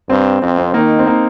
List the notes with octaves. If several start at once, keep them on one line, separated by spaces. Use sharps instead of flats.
G2 C4
F2 C4
C4
D#3 A#3 D#4
C4
A#3 D#4